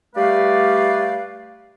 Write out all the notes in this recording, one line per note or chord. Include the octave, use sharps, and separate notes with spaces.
G3 A3 B4 D5 F5